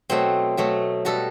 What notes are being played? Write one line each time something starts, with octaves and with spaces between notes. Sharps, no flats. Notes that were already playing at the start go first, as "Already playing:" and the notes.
B2 F#3 A3 C4
B2 F#3 A3
B2 G3 F#4 A4